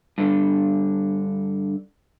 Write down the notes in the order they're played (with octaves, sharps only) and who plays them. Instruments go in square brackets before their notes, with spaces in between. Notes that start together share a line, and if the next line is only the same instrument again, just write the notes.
[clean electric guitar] G2 D3